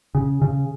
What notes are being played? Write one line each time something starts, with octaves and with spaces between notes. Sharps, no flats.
C#3
C#3